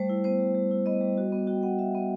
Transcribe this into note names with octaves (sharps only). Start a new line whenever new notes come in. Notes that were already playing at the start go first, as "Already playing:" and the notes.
Already playing: G3 A3 C5
E4
B3 C5
G3
G3
E4
B3 D#5
G3
F#4
B3
F#4 G5
B3 F#5
F#4 E5
B3